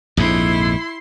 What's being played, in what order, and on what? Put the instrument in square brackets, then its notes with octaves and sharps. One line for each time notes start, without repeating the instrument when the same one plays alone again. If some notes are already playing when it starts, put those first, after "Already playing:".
[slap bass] A#1 F2 G#2 [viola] E4 C6